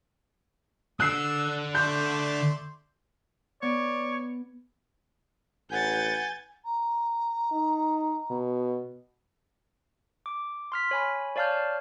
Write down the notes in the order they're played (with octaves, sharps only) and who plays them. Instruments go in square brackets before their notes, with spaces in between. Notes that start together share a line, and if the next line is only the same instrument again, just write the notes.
[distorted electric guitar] D3 D4 [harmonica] E6 [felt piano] F#6 C7
[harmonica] A3 D5 C6 [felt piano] G6
[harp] B3 [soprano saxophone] C#5 [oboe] D5
[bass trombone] A1 [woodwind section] B4 F#5 [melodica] G#5 [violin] G6 A6
[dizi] A#5
[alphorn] D#4
B2
[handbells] D6
C6 F6 B6
C#5 G#5 B5
C#5 D5 F5 A5 F6 G6